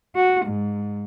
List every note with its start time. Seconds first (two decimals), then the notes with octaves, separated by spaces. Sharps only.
0.15 F#4
0.46 G#2